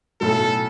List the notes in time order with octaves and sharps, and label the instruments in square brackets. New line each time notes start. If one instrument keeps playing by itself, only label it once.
[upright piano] B1 A2 F#3 [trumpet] A4